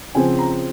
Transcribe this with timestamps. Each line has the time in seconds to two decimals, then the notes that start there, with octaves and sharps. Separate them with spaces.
0.15 C#3 F3 C4 G#5
0.39 A#5